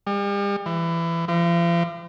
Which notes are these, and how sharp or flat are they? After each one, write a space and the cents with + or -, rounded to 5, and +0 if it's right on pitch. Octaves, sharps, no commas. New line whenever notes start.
G3 +40
E3 +25
F3 -45